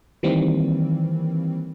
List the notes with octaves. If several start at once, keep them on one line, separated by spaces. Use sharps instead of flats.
D#3 E3 G3 A#3 C4